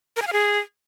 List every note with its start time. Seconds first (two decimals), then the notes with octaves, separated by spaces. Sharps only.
0.16 A#4
0.22 G#5
0.27 F5
0.33 G#4